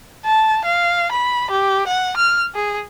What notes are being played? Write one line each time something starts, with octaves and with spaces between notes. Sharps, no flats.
A5
F5
B5
G4
F#5
F6
G#4